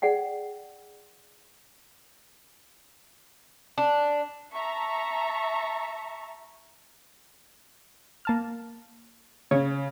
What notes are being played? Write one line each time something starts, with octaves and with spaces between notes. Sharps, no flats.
G#4 D5 F#5 G5
D4
E5 A5 A#5 C#6
A#3 A5 F6
C#3 C#5